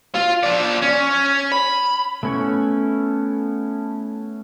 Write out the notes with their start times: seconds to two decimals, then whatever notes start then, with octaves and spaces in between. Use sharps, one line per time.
0.15 F4
0.43 F3 D5
0.82 C#4
1.52 B5
2.23 A3 B3 C#4 E4 C#5